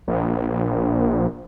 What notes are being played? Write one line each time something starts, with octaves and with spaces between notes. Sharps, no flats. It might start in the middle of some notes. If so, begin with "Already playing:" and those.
A#1